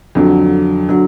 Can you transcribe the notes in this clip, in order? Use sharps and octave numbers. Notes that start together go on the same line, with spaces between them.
F2 D3 F#3
D3 F#3